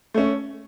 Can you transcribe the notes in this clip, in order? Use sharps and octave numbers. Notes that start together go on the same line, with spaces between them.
A3 C#4